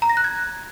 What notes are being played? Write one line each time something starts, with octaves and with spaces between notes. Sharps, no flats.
A#5
A#6
F#6
G#6